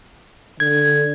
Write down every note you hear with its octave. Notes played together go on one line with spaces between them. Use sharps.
D3 G#6